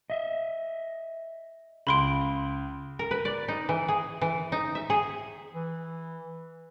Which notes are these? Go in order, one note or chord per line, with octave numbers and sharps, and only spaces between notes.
D#5 E5
C#2 B5 C6 D7
A#4
B4
D5
D#4
E3
G#4
E3
D#4
E5
G#4
E3